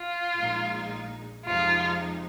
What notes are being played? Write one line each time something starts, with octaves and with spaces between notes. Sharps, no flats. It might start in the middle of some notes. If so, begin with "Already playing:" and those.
Already playing: F4
A#1 A#2 G#3 D#4
F2 C3 F3 G#3 D#4 F4